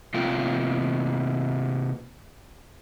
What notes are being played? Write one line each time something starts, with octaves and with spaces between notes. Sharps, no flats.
C3 A#3 F4 G5